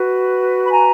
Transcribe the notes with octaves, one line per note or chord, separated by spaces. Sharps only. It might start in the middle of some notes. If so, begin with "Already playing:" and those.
Already playing: F#4 B4
B5
G#5 A#5